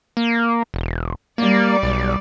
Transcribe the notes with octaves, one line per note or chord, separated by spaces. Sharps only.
A#3
E1
G3 A#3 D5
B1